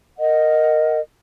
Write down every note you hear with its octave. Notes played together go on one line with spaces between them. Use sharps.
A#4 D#5 F#5